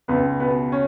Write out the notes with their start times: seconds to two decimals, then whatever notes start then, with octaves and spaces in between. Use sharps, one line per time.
0.08 C#2 B3 B4
0.40 B2 B3 B4
0.72 C#4